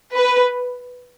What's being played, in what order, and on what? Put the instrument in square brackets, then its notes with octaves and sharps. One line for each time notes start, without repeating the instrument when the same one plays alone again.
[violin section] B4